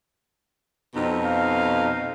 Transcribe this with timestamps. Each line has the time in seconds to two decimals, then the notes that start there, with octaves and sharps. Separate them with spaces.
0.95 F2 B2 D#4
1.24 F5